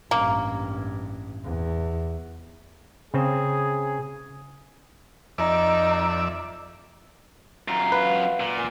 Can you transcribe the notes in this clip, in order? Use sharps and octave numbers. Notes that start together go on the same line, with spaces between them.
A1 G2 A#3
E2
C#3 C4 G#4
F2 D#4 D5 E5
F#2 F4 A#5
B4 F5 F#5
A#2
A#4 G#5